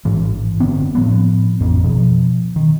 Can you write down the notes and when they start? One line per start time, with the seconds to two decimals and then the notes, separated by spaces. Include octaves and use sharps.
0.05 A1 G#2 E3
0.60 F#1 D3 B3 C4
0.95 A2 F3 B3
1.60 A1 F2
1.84 B2 F3
2.56 D#3